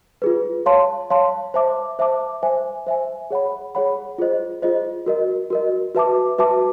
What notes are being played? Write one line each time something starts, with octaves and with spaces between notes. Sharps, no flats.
F4 G#4 B4
C#5 F5 A5 C6
C#5 F5 A5 C6
C5 E5 A5 D6
C5 E5 A5 D6
C5 E5 G#5
C5 E5 G#5
G#4 C#5 F#5 B5
G#4 C#5 F#5 B5
F4 G#4 C5 D#5
F4 G#4 C5 D#5
F#4 A#4 D#5
F#4 A#4 D#5
F#4 B4 E5 A5 D6
F#4 B4 E5 A5 D6